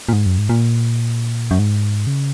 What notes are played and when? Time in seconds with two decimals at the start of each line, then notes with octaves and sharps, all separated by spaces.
0.09 A#2
0.13 G#2
0.26 F#2
0.38 G#2
0.49 A#2
1.51 F#2
1.59 G#2
2.07 C#3